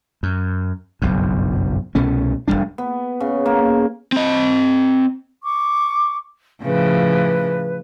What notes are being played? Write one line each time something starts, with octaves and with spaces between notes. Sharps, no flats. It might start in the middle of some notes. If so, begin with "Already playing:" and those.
F#2
F#1 B1 G2
C2 B2 A3 C#4
D1 D2 G3 D4
B3
C#3
A#3
C4 D#5
C#6 D6
A2 C#3 F3 B4